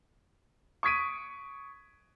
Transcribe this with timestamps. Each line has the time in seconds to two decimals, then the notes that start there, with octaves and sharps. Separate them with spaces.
0.83 C#6 D#6 G#6 B6 D7 D#7